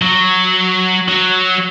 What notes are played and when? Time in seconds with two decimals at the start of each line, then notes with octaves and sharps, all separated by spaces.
0.02 F#3
1.08 F#3